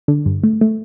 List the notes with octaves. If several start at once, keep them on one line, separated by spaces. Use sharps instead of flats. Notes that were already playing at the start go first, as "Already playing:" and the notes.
D3
G2
A3
A3